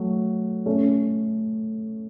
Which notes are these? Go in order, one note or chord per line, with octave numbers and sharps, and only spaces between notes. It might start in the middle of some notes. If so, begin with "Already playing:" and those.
Already playing: F#3 A3
A3 C#4